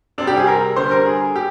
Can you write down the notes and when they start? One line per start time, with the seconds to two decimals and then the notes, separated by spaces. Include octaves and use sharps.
0.18 C3 G3 D4
0.27 G4
0.37 G#4
0.47 A#4
0.76 D3 G3 C5
0.91 A#4
1.06 G#4
1.36 G4